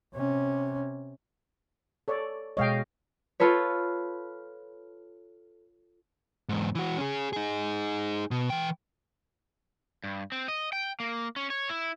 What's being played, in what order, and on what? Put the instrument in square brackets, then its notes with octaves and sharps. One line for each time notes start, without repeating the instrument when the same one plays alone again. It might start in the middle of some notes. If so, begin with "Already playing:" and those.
[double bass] C3 C#4
[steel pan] A4 C#5 D5
[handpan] B2 G#3 D#5 [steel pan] C#5 F5 G5
[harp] F4 A4 B4 C#5
[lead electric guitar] E2 G#2
E3 F#4
C#4 G#4
D#4 G#4
B2
E3 G5
[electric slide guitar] G2
C4
D#5
G5
A#3
C#4
C#5
E4